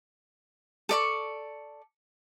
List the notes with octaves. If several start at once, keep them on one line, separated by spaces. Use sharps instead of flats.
A4 D5 C#6